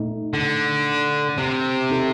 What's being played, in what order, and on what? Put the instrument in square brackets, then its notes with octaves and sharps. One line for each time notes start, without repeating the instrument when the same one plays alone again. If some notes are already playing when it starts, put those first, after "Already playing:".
Already playing: [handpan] A#2 A3 D#4
[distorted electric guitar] D3
C3
[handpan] C4 D#4 A4